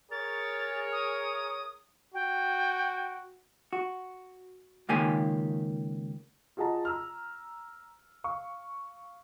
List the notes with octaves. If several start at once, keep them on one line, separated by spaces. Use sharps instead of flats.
G#4 A#4 C#5 A6
D#6
F#4 G5
F#4
C#2 D#3 A#3 G4 G#5
F4 F#4 G#4 D#5 A5 A#5
A#5 E6 F6
F5 C#6